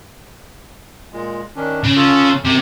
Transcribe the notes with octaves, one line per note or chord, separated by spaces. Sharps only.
A#2 G#3
D#3 C#4 D4
C#3
F4 A4
F#2 C3 D6